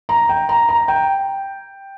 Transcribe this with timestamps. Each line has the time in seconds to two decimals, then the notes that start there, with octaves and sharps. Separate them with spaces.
0.09 A#5
0.29 G5
0.49 A#5
0.69 A#5
0.88 G5